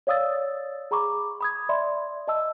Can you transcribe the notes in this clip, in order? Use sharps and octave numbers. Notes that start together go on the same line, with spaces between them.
C#5 D5 F5 D#6 E6 A6
G#4 A#5 B5 C#6 D6
B5 D#6 G#6
D5 E5 B5 C6
D#5 A5 E6